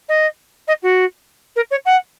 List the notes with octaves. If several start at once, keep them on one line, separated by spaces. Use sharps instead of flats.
D#5
D#5
F#4
A#4
C#5
F#5